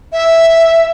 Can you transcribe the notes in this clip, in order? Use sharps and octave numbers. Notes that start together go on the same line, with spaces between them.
E5